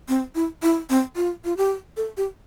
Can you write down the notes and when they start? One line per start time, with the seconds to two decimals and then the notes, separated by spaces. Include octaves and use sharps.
0.08 C4
0.35 E4
0.62 E4
0.90 C4
1.16 F4
1.45 F4
1.57 G4
1.97 A4
2.17 G4